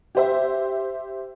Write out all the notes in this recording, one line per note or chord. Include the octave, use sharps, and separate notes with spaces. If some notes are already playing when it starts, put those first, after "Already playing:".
G4 C5 E5